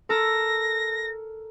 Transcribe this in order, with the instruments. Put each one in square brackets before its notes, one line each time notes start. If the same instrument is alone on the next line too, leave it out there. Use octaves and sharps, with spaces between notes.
[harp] A4 A#4 [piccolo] A#6